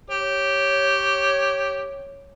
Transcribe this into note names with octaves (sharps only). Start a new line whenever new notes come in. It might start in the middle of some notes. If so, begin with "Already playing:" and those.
G4 C#5